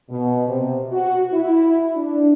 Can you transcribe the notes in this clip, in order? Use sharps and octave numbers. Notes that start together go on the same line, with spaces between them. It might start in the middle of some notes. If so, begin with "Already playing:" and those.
B2
C3
F#4
E4
D4